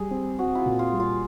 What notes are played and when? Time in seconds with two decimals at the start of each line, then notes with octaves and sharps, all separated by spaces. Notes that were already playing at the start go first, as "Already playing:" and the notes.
Already playing: G3 G#4
0.11 C4
0.38 C4 F#4
0.55 E4 F4
0.66 A#2
0.79 F4
0.93 G3
1.00 F4